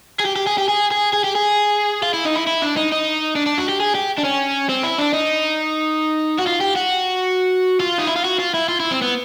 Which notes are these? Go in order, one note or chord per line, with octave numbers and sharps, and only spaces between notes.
G#4
G4
G4
G#4
G4
G#4
G#4
G#4
G4
G#4
F4
E4
D#4
E4
E4
D4
D#4
D#4
D4
D4
F#4
G4
G#4
G4
D4
C#4
C4
E4
D4
D#4
F#4
F4
G4
F#4
F4
D#4
E4
F4
F#4
F4
E4
F4
E4
C4
B3